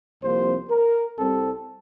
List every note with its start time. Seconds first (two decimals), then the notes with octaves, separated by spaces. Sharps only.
0.22 C2 C3 F3 A#3 C5
0.70 A#4
1.17 C2 C3 G3 C4 A4